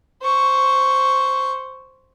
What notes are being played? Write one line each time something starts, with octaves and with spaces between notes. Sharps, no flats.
C5 C#6